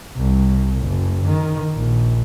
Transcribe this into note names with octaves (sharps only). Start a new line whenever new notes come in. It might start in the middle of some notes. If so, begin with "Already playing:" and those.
C2
F#1
D#3
A#1